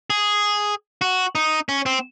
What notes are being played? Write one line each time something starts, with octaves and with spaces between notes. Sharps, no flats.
G#4
F#4
D#4
C#4
C4